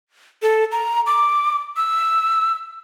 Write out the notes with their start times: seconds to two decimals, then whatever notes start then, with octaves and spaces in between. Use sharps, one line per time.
0.42 A4
0.72 A#5
1.06 D6
1.77 E6